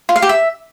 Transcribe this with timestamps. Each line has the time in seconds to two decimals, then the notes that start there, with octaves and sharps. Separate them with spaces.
0.09 F4
0.16 F5
0.22 G4
0.29 E5